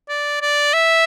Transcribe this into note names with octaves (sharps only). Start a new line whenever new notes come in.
D5
D5
E5